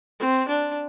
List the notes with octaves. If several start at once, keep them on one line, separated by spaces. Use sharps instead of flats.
C4
D4